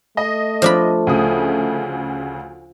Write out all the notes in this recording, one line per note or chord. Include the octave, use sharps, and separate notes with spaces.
A3 D#5
F3 D4 B5
D2 C#3 D#6